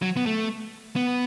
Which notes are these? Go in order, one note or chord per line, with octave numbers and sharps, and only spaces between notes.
F#3
B3
A3
B3